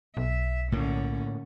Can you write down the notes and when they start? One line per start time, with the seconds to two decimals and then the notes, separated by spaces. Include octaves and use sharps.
0.17 B1 E5
0.72 A2 D3 A#3 C#4